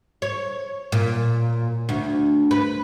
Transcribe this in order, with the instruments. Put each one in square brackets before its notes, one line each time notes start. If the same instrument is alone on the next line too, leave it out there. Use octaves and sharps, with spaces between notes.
[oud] C#5
A#2
D2
B4